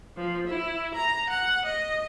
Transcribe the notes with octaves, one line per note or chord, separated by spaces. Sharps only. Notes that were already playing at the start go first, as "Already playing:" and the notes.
F3
E4
A#5
F#5
D#5